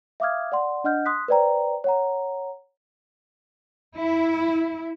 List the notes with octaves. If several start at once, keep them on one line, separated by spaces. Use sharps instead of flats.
E5 F5 D6 D#6 F6 G#6
D5 F#5 C6
D4 D#5 F#5 F6 G6
C6 D#6 F#6 B6
B4 C5 D5 G5 A#5
C#5 F#5 A#5
E4